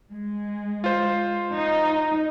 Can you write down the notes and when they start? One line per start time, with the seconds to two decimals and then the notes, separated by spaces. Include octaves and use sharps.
0.11 G#3
0.84 F4 C5
1.54 D#4